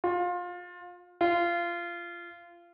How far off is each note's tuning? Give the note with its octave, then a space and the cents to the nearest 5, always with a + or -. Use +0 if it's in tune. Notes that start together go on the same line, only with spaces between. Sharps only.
F4 +25
F4 -20